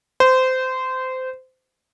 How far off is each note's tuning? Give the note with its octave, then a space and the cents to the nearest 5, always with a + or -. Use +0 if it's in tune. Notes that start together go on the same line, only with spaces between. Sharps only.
C5 -20